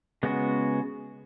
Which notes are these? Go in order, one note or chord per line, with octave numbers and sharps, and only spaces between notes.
C#3 G#3 B3 F#4